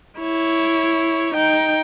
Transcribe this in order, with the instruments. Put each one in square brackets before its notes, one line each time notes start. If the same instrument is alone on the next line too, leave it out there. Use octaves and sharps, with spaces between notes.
[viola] E4 C#5
D#4 G5